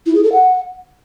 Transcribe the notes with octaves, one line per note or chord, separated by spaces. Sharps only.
E4
G#4
A4
F#5